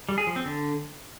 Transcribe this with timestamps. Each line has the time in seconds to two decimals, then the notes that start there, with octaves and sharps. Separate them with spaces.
0.09 G3
0.18 G#4
0.27 F3
0.36 C4
0.45 D3